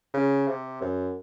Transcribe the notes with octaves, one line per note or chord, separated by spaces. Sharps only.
C#3
C3
F#2